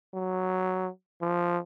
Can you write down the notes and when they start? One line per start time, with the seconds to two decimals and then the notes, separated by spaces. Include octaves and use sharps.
0.14 F#3
1.21 F3